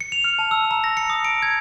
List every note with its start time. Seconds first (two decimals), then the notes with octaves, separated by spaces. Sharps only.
0.01 C#7
0.12 F7
0.24 F6
0.39 A5
0.51 E6
0.71 A#5
0.84 A#6
0.97 C#7
1.10 D#6
1.25 D7
1.42 G#6